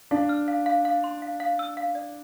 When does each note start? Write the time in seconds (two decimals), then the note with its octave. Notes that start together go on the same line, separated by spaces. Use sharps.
0.11 D4 F5
0.29 F6
0.48 F5
0.66 F5
0.85 F5
1.04 C6
1.22 F5
1.40 F5
1.59 E6
1.77 F5
1.95 D5